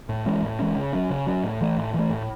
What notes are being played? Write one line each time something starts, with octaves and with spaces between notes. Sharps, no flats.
A2
E3 G#3 C#4
A2
E3 G#3 C#4
C#3
F#3 C#4
C#3
F#3 C#4
A2
E3 A3
A2
E3 A3
A2